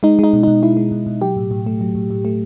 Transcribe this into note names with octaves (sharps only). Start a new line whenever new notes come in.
G#3 D#4
G#3 D#4
B2
B2 D#4
G#3 E4
G#3
B2
B2
F#3 G4
A2
A2
A3
F#3
A2
A2
A3